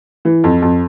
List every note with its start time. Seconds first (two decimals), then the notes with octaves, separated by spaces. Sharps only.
0.25 E3
0.44 F2
0.62 F2